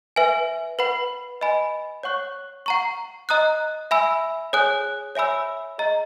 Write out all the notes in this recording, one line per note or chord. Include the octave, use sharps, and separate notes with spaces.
B4 E5 G#5
B4 F#5 B5
D#5 G#5 B5
C#5 F#5 C#6 F#6
F#5 A#5 C#6
D#5 A#5 D#6 F#6
E5 G#5 B5 E6
G#4 C#5 G#5 D#6 F#6
C#5 E5 G#5 B5 E6
G#4 D#5 A#5